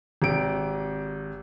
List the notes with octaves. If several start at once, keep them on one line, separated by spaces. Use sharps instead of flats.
G#1 C3 D7